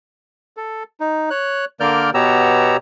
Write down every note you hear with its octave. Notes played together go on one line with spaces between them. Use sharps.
A4
D#4
C#5 F#6
D3 A#3 A#4 D5 F6 G6
B2 B3 G4 C#5 A#5 E6